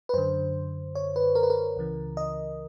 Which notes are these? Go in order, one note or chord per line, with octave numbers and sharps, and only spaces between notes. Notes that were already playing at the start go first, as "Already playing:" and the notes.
B4
F#2 D3 C5
C#5
B4
A#4
B4
A#4
C#2 C#3 E3
D#5